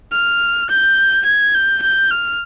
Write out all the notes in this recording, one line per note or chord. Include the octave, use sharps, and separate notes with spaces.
F6
G6
G#6
G6
G6
F6